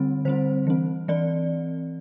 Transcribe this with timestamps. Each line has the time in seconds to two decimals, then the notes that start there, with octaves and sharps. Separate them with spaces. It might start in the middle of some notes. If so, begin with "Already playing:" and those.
Already playing: D3 G3 C4
0.25 D3 G3 C4 C5
0.67 E3 C4
1.08 E3 C4 D5